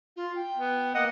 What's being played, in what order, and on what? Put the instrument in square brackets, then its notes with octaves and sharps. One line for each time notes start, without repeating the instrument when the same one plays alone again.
[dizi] F4
G5
[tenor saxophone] B3
[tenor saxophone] A#3 [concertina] D#5 F#5 D#6